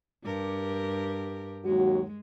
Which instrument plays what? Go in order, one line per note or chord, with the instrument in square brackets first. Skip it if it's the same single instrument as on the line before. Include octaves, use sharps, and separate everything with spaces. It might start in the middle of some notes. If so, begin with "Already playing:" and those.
[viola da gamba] G2 G4 A#4
[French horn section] D#2 F#3 F#4 [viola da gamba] G#3